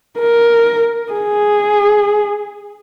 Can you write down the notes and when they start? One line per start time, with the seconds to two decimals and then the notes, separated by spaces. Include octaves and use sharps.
0.19 A#4
1.13 G#4